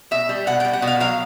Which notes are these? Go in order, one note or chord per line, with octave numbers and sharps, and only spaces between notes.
B2 E5
G3
B2 F#5
G3 G5
F#5
B2
F5
F#3 F5